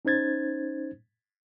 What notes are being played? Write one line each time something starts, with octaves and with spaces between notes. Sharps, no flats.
C#4 D#4 C5 G#6 A6